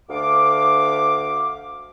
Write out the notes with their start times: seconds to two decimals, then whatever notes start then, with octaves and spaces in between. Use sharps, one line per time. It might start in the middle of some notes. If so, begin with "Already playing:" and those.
0.10 D2 F5 D6